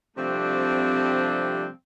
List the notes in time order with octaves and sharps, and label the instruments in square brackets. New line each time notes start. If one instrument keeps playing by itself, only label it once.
[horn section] C3 F3 G3 A3 C4 D4